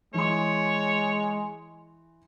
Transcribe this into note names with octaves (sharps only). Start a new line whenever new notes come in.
E3 G#3 C#5 C6